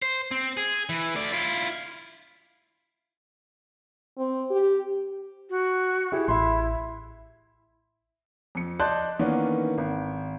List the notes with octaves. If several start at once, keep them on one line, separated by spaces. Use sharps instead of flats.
C5
C4
G#4
E3
A3 D5
E4 F4
C4
G4
F#4
E4 G4 G#4
A1 E4 E5 B5 C6
F2 C#7
D5 D#5 A5 C6 F#6 G6
D#3 E3 A#3 B3 C#4 D4
G#1